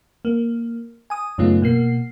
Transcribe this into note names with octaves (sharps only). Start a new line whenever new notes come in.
A#3
G#5 D#6
F#2 C#3 A3 B3 D#4 F4
B2 A#3 C7